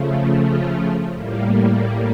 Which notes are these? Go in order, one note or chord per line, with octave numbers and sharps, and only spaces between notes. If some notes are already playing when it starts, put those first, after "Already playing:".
Already playing: C#3 F3 A3
F4
A2 G3 A#3